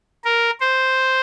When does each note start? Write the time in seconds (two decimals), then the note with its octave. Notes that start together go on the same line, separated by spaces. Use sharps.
0.24 A#4
0.61 C5